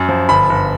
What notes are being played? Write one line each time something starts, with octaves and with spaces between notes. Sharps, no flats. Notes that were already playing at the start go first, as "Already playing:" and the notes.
Already playing: F#2
F3
G1 B5
G1